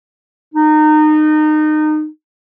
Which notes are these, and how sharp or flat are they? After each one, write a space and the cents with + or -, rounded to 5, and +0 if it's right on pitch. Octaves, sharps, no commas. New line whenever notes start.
D#4 -25